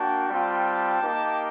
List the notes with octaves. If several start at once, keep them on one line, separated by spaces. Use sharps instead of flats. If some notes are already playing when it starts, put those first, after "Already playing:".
Already playing: A#3 D4 F#4 G5 A5
G3 C4 F4
A#3 D#4 G4